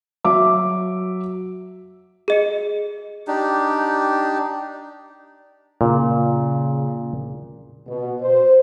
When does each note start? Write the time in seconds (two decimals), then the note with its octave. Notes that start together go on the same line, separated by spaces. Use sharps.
0.25 F#3 E5 D6
2.28 G#4 D#5 C#7
3.28 D4 D#4 G4
5.81 A#2 C#3
7.87 B2
8.22 C5